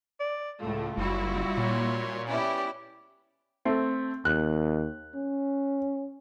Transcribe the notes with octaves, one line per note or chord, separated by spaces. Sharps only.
D5
C#2 A2 A3 F4
F#1 G3 E4 F#4
A#2 C#5 C6
B3 C#4 E4 G4 D5
A3 C4
D#2 F#6
C#4